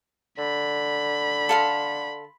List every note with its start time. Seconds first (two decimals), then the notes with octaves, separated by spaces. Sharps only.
0.38 D3 B5
1.49 A4 F5 C6